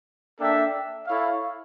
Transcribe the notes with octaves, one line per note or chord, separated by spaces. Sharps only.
A#3 D4 A4 E5 G5
E4 A4 C#5 F5